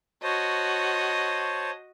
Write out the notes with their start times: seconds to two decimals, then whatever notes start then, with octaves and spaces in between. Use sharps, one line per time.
0.23 F#4 C5 C#5 D#5 A5